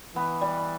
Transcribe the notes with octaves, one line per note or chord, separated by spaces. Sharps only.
E3 B3
G3